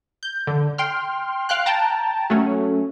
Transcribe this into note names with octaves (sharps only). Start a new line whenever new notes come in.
G6
D3
G5 C6 F6
F5 G5 F#6
G5 A5 A#5
F#3 A3 C#4